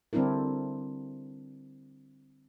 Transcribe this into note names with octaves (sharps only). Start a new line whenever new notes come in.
D3 G3 C4 D4 E4 A#4